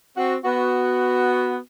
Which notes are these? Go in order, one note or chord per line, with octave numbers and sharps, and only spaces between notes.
C4 F#4
B3 F#4